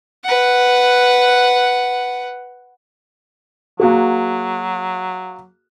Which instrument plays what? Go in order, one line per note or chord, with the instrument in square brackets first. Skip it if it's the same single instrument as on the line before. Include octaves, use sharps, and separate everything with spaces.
[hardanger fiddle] B4 F#5
[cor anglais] F#3 [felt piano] A#3 F#4 G#4